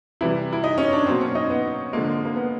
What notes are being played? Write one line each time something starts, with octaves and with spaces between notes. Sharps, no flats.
C3 E3 G3 E4
E4
D#4
C#4
D4
B2 F#3 A#3 C4
C#4
D#4
B3
D3 F3 G#3 A#3
A#3
B3